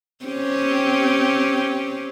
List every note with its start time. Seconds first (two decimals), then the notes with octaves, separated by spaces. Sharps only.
0.25 C4 C#4 G4